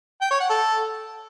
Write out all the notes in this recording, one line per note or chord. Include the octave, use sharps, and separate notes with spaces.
G5
C#5
F#5
A4